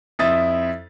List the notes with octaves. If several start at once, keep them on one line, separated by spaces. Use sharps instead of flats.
F2 E4 E5 D#6 A6